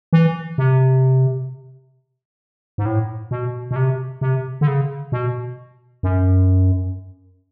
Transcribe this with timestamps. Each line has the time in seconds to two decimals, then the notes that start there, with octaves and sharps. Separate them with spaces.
0.13 E3
0.58 C3
2.78 G#2
2.85 A2
3.31 B2
3.71 B2
3.76 C3
4.21 C3
4.61 D3
4.67 C#3
5.12 B2
6.03 F#2